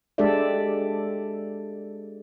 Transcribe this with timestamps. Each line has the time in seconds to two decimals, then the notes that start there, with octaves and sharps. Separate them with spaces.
0.18 G#3 D4 G4 A4 D5 E5